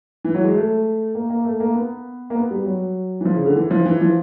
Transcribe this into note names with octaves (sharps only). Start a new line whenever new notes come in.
E3
F#3
G#3
A3
A#3
A#3
A3
A#3
B3
A#3
B3
G3
F#3
E3
F3
C#3
D3
E3
F3
E3
F3